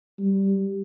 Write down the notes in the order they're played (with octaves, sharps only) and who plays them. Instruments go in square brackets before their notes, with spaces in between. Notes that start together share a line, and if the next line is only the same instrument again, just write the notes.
[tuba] G3